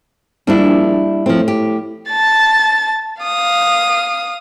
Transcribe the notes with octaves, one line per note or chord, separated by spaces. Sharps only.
A#1 G3 D4 E4
A2 F3 C4
G4
A5 A6
F5 D#6